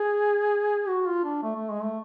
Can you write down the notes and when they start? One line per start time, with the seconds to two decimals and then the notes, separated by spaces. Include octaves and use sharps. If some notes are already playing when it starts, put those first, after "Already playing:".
Already playing: G#4
0.88 F#4
1.06 F4
1.24 D4
1.43 A3
1.56 A3
1.70 G#3
1.84 A3